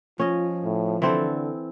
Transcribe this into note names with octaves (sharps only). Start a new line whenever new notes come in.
F3 C#4 F4 D#5
A2
D3 E3 C4 A4